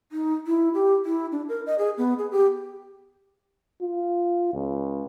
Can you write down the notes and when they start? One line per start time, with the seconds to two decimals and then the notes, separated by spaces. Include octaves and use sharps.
0.12 D#4
0.47 E4
0.74 G4
1.05 E4
1.32 D4
1.49 A#4
1.66 D#5
1.79 G#4
1.98 B3
2.18 G#4
2.31 G4
3.82 F4
4.54 C#2